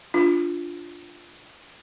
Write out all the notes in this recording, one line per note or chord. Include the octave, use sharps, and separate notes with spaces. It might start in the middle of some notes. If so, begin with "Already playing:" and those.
D4 F4